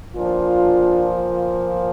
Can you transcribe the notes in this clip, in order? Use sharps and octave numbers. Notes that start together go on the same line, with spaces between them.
A#2 F3 D4 F4